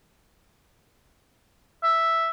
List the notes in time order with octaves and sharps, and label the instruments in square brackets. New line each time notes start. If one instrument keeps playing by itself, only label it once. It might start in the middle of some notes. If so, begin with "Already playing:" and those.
[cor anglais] E5